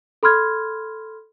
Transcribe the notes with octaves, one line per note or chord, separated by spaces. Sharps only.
A4 B5 C6 F6 G#6